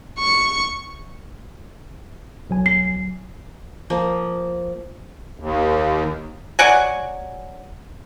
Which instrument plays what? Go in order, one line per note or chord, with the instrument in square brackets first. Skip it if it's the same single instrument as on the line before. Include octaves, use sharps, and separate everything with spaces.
[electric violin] C#6
[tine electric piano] B1 F#3 G#5
[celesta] C7
[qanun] F3 A#3
[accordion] D#2
[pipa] F#3 D5 F#5 G#5